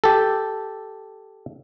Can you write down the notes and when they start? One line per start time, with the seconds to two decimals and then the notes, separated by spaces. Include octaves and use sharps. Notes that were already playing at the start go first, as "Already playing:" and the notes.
0.04 G4 A4